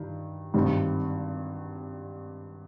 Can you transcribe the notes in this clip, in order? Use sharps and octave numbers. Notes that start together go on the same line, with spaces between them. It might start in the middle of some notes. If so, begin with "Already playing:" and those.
Already playing: G2 D#3
G#1 G2 D#3 G3 C4